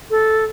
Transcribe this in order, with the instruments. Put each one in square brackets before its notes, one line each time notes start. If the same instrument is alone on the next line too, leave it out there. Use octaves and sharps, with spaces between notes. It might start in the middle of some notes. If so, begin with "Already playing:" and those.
[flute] A4